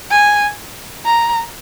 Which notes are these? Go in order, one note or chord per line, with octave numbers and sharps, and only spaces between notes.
G#5
A#5